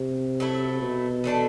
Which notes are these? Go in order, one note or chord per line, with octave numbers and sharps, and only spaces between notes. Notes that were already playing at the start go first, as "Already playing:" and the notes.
Already playing: C3
F#3 A3 E4
B2
E3 A3 D4 A4